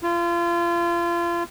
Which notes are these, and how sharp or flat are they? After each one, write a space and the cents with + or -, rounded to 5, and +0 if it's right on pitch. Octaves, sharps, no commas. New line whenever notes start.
F4 -30